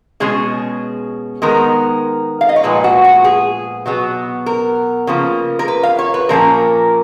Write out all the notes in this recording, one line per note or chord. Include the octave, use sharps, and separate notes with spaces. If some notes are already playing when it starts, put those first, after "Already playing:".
B2 G#3 C#4 G#4
D#3 G#3 B3 A#4
F5
D#5
C#5
A#2 F3 G#3 B3 B4
F#4
F#4
G#4
B2 F#3 B3
A#4
C#3 F3 A#3
A#4
B4
F5
C#5
B4
A#2 F3 A#3 C#4 A#4